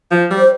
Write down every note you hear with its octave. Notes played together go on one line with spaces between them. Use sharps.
F3
G3
C5